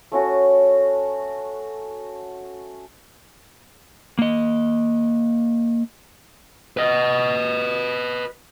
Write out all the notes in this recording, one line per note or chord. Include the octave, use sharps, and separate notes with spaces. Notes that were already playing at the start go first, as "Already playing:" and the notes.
A3 C#4 F#4
A#3 D#5
B4 D#5